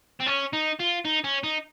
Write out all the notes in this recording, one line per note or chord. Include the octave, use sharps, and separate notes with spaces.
C4
C#4
D#4
F4
D#4
C#4
D#4